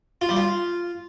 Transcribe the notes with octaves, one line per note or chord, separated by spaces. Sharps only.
F4
G3
F4